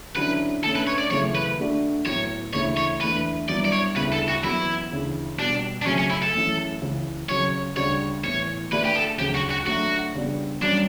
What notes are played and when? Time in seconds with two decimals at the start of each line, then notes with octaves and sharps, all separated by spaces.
0.16 D3 F#3 C#4 E4 B4
0.63 D3 A3 C#4 A4
0.75 B4
0.87 C#5
0.99 D5
1.10 F#2 C#3 E3 A3 C#5
1.35 B4
1.58 D3 A3 D4 F#4
2.06 A2 F#3 B3 C#5
2.53 D2 C#3 E3 A3 E4 C#5
2.77 C#5
3.01 E2 D3 A3 E4 B4
3.49 G2 F#3 B3 E4 D5
3.65 D5
3.73 C#5
3.96 D2 C#3 G3 B3 E4 B4
4.12 A4
4.28 F#4
4.43 F#2 E3 B3 E4 F#4
4.91 D2 C#3 E3
5.39 B2 G3 B3 D4
5.82 D4
5.86 F#2 C#3 F#3 A3 C#4
5.98 C#4
6.10 E4
6.22 A4
6.35 F#2 E3 A3 C#4
6.81 C#2 C#3 E3
7.29 F#2 C#3 F#3 C#4 C#5
7.77 D2 C#3 G3 D4 F#4 C#5
8.24 A2 E3 B3 C#5
8.72 D3 A3 D4 F#4 B4
8.84 G4
8.95 A4
9.19 D2 C#3 F#3 G4
9.35 F#4
9.51 F#4
9.67 D3 F#3 A3 F#4
10.15 C#3 G3 B3 D4 F#4
10.62 G2 F#3 C#4 D4